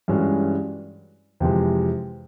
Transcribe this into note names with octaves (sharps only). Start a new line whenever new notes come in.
G2 E3 G#3 C#4 F#4
F2 C3 E3 G#3